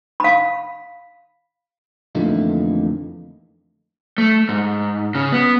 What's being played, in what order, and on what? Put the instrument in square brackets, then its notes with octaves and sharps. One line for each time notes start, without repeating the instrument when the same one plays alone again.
[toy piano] F5 B5
[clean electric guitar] F2 D3 E3 A3 A#3 D#4
[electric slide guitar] A3
G#2
C#3
B3